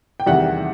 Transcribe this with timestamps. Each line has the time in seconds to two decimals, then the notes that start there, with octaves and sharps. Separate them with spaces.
0.20 G5
0.26 E2 C3 D#3 G3 E5 F#5